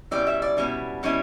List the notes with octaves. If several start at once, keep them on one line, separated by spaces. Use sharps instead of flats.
B2 G3 C#4 E4 D5
E5
D5
B2 G3 C#4 E4
B2 G3 C#4 E4